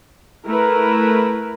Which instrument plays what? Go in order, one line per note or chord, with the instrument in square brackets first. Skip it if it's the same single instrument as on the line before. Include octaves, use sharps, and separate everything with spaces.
[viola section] A3 E4 A#4 B4